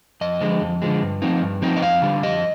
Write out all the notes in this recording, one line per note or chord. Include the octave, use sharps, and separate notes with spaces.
F2 D#5
D3 F3 G#3
F2
D3 F3 G#3
G2
F3 C4 D#4
G2
F3 C4 D#4
D#5
F2 F5
D3 G3
F2 D#5